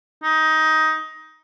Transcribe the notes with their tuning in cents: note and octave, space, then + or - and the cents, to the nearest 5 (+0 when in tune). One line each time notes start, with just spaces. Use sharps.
D#4 +15